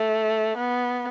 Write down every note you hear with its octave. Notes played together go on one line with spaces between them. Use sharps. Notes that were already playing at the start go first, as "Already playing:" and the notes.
Already playing: A3
B3